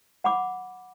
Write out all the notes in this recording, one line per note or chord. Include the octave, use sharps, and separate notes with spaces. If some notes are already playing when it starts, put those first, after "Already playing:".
F#5 B5 D6